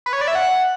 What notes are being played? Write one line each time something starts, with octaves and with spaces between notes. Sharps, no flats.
B4
C#5
D5
E5
F#5